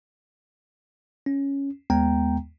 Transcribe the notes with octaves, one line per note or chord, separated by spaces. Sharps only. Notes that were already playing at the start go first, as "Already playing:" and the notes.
C#4
D#2 G#3 B3 G5 A#5